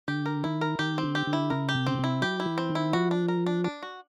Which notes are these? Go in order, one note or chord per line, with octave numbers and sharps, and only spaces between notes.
D3 G4
A#4
D#3 E4
A#4
D#3 G4
C4
D3
G4
D3
E4
C#3 A#4
G4
C3
C#3 C4
C3 E4
F#3 G4
E4
E3
C4
D#3
E4
F3 F#4
D4
A#4
D4
D4
F#4